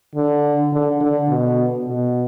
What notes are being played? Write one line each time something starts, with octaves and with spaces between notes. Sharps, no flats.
D3
D3
D3
B2
B2